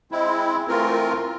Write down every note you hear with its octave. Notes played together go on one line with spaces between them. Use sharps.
G#3 C4 E4
E3 A3 C4 F4 A#4